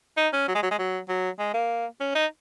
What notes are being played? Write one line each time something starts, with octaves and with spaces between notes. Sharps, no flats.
D#4
C#4
F#3
G#3
F#3
G#3
F#3
F#3
G#3
A#3
C#4
D#4